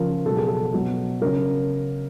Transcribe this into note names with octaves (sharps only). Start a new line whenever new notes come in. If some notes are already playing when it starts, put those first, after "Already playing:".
Already playing: C#3 F3 A#4
B2 F#3 A4
G#4
A4
B2 F#3
C#3 F#3 A#4